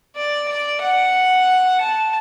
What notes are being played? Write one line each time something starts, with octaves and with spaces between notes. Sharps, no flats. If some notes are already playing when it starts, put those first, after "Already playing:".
D5
D5
F#5
A5